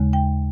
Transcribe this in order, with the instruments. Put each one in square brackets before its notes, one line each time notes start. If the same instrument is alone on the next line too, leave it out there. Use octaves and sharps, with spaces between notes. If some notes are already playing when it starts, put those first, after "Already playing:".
Already playing: [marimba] D#2 C#3 G#3
G5